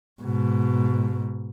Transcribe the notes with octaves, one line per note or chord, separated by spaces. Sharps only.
G#2 B2